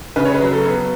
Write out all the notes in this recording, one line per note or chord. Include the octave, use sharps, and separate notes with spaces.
C#3 B4
C#5
B4
F#3
A4
B3